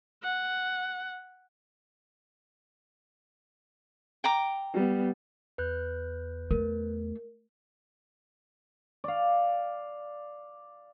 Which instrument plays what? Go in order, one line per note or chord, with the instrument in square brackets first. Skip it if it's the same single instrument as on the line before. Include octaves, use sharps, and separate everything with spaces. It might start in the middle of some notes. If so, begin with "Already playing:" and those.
[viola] F#5
[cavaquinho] G5 A#5 D6
[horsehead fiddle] G3 B3
[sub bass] E2 [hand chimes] B4 F#6 G6
[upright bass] A3 [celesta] A#4
[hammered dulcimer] D5 F5